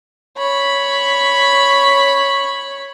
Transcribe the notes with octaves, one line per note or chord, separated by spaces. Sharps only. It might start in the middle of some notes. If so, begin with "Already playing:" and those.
C#5 B5